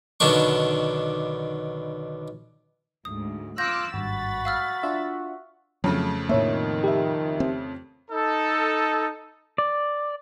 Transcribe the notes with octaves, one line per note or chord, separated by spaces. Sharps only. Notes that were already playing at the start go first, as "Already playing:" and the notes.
B1 D3 D#3 B3 D4 C#6
D2 G#2 D#6
F4 D6 E6 F#6 G6 A#6
G#1 G2 F#4 B5 A6
F5 E6 F6
D4 F4 E5
F2 C#3 F#3 A3
A2 D#3 A#3 C#5 E5
G4 E5
C4
D#4 A4
D5